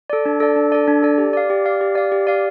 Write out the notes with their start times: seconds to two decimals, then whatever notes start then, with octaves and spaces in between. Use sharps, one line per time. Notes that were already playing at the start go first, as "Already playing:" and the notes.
0.10 A4 D5
0.25 D4
0.40 A4 D5
0.56 D4
0.72 A4 D5
0.88 D4
1.03 A4 D5
1.18 G4
1.33 D5 F5
1.50 G4
1.66 D5 F5
1.81 G4
1.95 D5 F5
2.12 G4
2.27 D5 F5